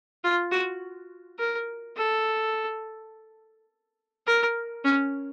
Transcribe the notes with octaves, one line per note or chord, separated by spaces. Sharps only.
F4
F#4
A#4
A4
A#4
C#4